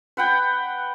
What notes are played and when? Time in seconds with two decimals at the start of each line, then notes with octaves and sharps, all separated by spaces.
0.17 B4 F#5 G5